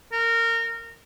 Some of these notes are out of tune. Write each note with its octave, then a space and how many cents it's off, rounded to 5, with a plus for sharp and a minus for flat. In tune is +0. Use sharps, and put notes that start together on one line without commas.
A#4 -20